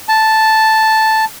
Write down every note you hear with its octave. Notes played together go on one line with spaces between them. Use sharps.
A5